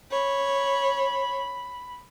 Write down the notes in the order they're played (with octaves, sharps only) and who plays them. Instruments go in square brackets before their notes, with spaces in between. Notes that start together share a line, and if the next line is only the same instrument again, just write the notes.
[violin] C#5 [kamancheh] B5